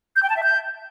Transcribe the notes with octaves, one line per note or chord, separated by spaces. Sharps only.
G6
G5
A5
E5
G6